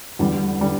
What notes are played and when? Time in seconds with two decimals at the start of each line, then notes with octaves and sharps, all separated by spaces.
0.19 E2 D3 G3
0.61 D3 G3